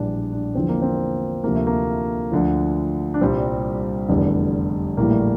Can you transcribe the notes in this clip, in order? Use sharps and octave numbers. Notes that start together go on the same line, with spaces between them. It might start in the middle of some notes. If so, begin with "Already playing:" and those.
Already playing: A#1 A2 E3 G3 D4
D4
E2 D3 F3 C4
A#3
C4
D2 C3 F3 A#3
A3
A#3
D2 D3 F3
D4
C2 A#2 G3 C4
F1 E2 D3 G3
A#1 A2 E3 G3 A#3
A3